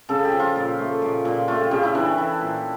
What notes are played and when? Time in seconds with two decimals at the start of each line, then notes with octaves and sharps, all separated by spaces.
0.09 C#3 A4
0.25 G4
0.32 F3
0.40 F4
0.56 A#2
0.79 A3
1.02 A#2
1.25 A#2
1.48 A3 F4
1.60 G4
1.71 C#3 G4
1.83 E4
1.95 E3 D4
2.18 E3
2.41 A#2